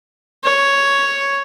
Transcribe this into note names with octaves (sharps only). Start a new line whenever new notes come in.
C#5